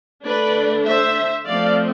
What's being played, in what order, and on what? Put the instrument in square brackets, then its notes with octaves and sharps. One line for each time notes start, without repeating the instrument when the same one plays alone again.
[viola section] D3 A3 D4 B4 D5
C5 E5
F3 A3 C4 D5 F5